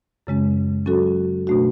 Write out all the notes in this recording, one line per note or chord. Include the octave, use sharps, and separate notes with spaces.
F#2 C#3 G#3 C#4
F#3 C#4 F#4 A4
B2 A3 D4 F#4